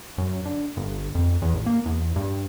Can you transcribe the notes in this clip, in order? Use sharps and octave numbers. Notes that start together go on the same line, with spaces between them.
F#2
D3
G1
F2
E2
A1
A#3
E2
G2